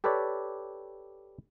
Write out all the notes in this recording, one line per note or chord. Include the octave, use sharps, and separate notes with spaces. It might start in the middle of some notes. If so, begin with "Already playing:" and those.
G4 A4 B4 C#5 D5